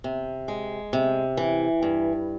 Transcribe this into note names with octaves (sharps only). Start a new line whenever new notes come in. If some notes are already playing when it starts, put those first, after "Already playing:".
C3
G#3
C3
E3
G2